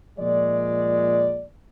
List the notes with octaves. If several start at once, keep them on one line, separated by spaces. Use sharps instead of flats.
A#2 F3 G#3 D5